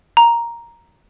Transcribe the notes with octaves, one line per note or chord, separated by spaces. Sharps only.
A#5